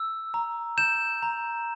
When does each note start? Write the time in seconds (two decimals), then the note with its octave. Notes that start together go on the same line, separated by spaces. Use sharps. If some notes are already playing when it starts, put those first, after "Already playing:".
Already playing: E6
0.34 A#5
0.77 G6 E7
1.23 A#5